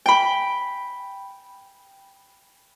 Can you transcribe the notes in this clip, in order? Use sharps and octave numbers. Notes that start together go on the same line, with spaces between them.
G5 B5